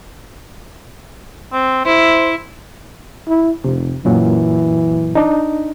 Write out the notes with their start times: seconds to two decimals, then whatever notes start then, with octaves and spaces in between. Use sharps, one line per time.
1.53 C4
1.86 E4 C5
3.29 E4
3.64 F1 C3
4.05 F#2 A#2 E3 F#3
5.15 D4 D#4